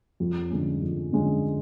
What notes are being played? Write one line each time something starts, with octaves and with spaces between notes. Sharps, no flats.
F2
D3 G#3 C#4
F2
D3 G#3 C#4